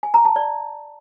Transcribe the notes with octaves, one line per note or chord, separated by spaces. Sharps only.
G#5
A#5
A5
D5